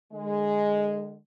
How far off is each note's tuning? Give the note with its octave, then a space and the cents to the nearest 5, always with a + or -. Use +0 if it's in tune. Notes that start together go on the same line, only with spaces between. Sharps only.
D3 +35 G#3 -5